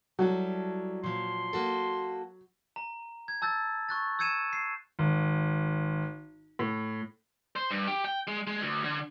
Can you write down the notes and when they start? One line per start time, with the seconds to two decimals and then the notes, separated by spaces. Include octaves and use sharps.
0.19 F#3 G3 E4 A4
1.04 A#2 F3 C6
1.53 A#3 F#4 A4
2.76 A#5
3.28 G#6
3.42 A5 E6 G6 A6
3.89 C#6 F#6 A6
4.19 E6 G6 G#6 C#7 D#7 E7
4.53 C7
4.99 G#1
6.59 A2
7.56 C5
7.71 G2
7.87 G4
8.05 G5
8.27 G#3
8.47 G#3
8.61 D2
8.84 D3